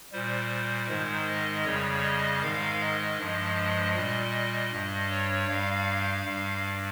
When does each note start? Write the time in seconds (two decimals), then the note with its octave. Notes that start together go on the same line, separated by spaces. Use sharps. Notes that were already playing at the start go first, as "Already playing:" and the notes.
0.12 A#2 G3 C5
0.88 G#2 D#3 G#3 C5
1.27 D#5
1.65 F2 C#3 G3 C#5
2.03 D#5
2.42 G#2 D#3 G#3 F5
2.81 D#5
3.19 G2 F3 G#3
3.58 D#5
3.96 A#2 G3 D#5
4.72 G2 G3
5.11 C#5
5.49 G2 G3 F5
6.25 G2 G3